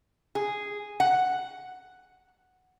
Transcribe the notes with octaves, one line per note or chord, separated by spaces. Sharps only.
G#4
F#5